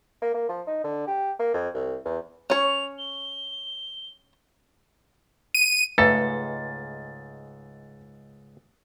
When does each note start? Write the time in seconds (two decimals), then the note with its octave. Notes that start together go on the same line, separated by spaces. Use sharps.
0.22 A#3
0.34 A#3
0.49 F3
0.67 D#4
0.84 D3
1.07 G4
1.39 A#3
1.54 F2
1.74 C2
2.05 E2
2.50 C#4 C#5 F7
2.99 G7
5.54 D#7
5.98 C#2 G#2 A3 A4 B4 A6